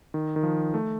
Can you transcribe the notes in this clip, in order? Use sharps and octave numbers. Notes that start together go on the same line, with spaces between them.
D#3
D#3
F3
A3